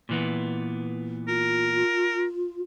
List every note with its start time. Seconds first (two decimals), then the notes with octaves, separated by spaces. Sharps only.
0.09 A#2 E3 B3
1.28 F4 A#4